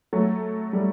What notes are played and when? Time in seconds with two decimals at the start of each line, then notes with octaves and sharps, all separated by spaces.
0.13 F#3 A3
0.73 G3